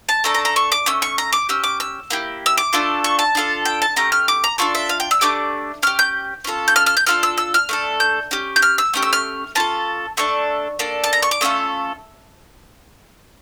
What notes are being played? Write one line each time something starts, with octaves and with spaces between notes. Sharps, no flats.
A5
A3 D4 A4 A#5
A#5
A#5
C#6
D6
A3 C#4 E6
C#6
A#5
D6
C#4 G4 E6
D6
E6
A#3 E4 G4
E6
D6
A3 D4 F4 A4
C#6
A5
D4 F4 A4
G5
A5
A3 C#4 G4 A#5
F6
D6
A#5
D4 F4 A4 C#6
E5
F5
G5
E6
A3 D4 G4 D6
C#4 G4 F6
G6
C#4 F4 A4
G6
F6
F6
G6
D4 F4 A4 F6
E6
E6
F6
A3 D4 A4
G6
C#4 G4
G6
F6
E6
A3 C#4 G4
E6
F6
C#4 F4 A4 A5
A3 D4 A4 C#6
A#3 D4 A4
A5
A#5
C#6
D6
A3 C#4 F4 A4 E6